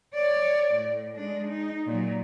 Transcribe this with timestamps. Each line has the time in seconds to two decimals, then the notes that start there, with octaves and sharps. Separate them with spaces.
0.15 C#5 D5
0.75 A2
1.15 G#3 D4
1.48 D#4
1.87 A#2 F#3